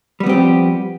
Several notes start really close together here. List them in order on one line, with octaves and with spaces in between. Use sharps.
G3 B3 C4 G4 F3